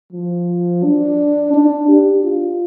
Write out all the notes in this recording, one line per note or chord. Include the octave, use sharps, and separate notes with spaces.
F3
D4
D4
G4
F4